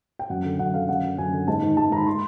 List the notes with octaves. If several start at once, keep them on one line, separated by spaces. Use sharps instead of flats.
G5
F#2 F#5
D3
F#2 F#5
D3 F5
F#2 F#5
D3
F#2 G#5
D3
G#2 A5
D#3
G#2 A5
D#3 A#5 B5
C6